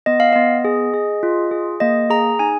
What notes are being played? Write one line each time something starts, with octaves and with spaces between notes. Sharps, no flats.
B3 D#5
F5
B3 D#5
G#4
G#4
F4
G#4
A#3 D#5
G#4 A#5
D#4 G#5